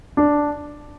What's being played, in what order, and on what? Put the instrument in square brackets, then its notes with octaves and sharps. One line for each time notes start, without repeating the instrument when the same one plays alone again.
[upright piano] D4